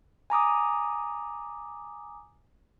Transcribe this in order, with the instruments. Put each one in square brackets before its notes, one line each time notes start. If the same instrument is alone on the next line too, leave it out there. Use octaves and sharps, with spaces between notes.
[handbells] G#5 A#5 D6 D#6